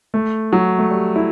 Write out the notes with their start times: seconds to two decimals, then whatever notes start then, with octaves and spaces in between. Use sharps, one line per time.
0.14 A3
0.53 F#3
0.79 A3
0.91 G3
1.16 E4